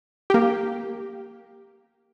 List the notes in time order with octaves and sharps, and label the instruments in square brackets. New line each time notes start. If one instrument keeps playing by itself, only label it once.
[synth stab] A#3 G4